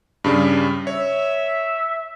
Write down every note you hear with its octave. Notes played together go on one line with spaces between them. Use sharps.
G2 C#3 G3
C#5 E5